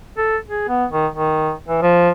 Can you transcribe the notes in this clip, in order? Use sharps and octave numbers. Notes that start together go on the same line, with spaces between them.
A4
G#4
B3
D#3
D#3
E3
F3